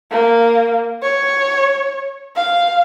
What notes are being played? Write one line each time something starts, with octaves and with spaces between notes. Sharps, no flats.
A#3
C#5
F5